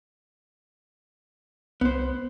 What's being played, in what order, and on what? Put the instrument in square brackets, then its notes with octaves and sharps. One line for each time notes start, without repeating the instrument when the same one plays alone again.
[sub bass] C2 [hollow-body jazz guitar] B3 C5